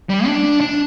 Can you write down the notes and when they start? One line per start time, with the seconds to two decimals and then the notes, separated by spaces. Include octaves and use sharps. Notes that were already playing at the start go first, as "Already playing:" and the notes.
0.09 G3
0.26 D4
0.61 D4